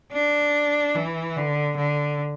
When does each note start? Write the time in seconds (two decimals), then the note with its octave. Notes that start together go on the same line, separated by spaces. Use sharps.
0.13 D4
0.95 E3
1.36 D3
1.77 D3